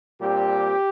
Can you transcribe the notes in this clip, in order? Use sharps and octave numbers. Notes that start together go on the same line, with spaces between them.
A#2 G3 C4 G4